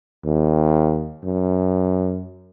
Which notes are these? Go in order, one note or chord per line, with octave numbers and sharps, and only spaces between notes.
D#2
F#2